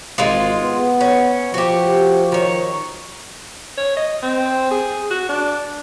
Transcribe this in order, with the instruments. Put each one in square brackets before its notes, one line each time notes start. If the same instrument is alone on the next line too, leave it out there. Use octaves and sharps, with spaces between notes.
[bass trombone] G#1 [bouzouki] G#3 F4
[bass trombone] B3
[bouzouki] C#4
[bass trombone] F3 [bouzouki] F#4 G4
[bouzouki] D#3 C#5
[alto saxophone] C#5
D#5
C4
G#4
F#4
D4